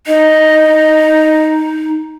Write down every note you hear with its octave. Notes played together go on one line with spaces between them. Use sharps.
D#4 D#5